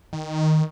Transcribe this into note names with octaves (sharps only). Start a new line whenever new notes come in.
D#3